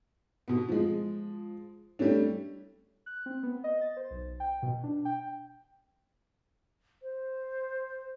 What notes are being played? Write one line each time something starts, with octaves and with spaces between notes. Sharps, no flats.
B2 B3
F3 G#3
G3 A3 C#4 D4
F#6
C4
B3
D#5
A6
C5
B1
G5
B2
D4
G5
C5